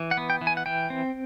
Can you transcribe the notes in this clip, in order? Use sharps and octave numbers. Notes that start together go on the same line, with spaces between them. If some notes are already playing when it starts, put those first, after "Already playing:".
Already playing: E3
F#5
B3
G5
E3
G#5
F#5
E3 G5
C4